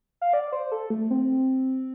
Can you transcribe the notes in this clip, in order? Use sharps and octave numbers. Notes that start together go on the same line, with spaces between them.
F5
D5
C5
A4
A3
C4